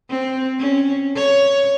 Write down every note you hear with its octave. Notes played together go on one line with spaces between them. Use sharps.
C4
C#4
C#5